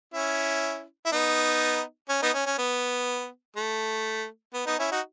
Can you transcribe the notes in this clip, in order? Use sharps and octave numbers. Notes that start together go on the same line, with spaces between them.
C#4 E4
E4
B3 D#4
C#4
B3 D#4
C#4
C#4
B3
A3
B3
B3 D#4
C#4 E4
D#4 F#4